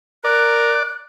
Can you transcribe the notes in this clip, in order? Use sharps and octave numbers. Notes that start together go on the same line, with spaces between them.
A#4 D5 F#6